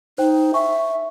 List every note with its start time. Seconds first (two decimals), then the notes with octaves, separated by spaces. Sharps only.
0.18 D#4 C5 G5
0.54 E5 G#5 C#6